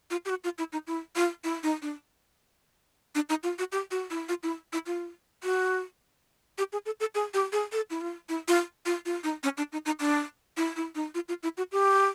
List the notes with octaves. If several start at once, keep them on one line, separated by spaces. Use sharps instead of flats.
F4
G4
F#4
F4
E4
D#4
E4
F4
E4
D#4
D4
D4
D#4
F4
F#4
G4
F#4
E4
F4
E4
E4
F4
F#4
G4
G#4
A4
A4
G#4
G4
G#4
A4
E4
F4
E4
F4
F4
F4
D#4
C#4
D4
D#4
D#4
D4
E4
E4
D#4
F4
F4
E4
F#4
G4